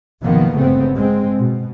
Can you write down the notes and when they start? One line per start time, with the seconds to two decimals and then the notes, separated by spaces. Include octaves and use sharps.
0.21 F#1 B2 D#3 F3 A#3 B3
0.55 G1 G#2 C#3 A3 B3 C4
0.94 G#3 C4
1.38 B2